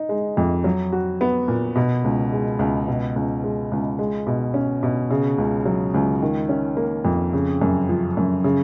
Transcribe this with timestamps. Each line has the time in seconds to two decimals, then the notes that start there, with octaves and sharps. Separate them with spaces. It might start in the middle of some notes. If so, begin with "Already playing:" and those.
Already playing: D#4
0.09 G#3
0.37 F2
0.64 F#3
0.92 F#4
1.21 B3
1.48 A#2
1.76 B2
2.04 C#2
2.32 G#3
2.59 C#2
2.88 B2
3.16 C#2
3.44 G#3
3.72 C#2
3.99 G#3
4.27 B2
4.54 C#4
4.83 B2
5.11 C#3
5.38 C#2
5.65 F#3
5.94 C#2
6.22 D#3
6.49 C#4
6.77 A#3
7.05 F2
7.33 C#3
7.62 F#2
7.89 F3
8.17 F#2
8.44 C#3